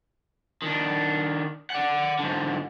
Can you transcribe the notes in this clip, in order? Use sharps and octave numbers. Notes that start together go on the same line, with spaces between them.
D#3 D4
D5 F#5
G#2 D3